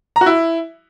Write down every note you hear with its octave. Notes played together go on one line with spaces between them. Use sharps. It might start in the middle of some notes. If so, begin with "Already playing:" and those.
A#5
F#4
E4